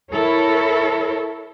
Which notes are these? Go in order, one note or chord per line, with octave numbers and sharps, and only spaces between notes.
E4 A4 A#4 C#5